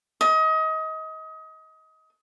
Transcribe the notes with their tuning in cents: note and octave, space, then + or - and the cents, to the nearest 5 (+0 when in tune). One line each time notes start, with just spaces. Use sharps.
D#5 +30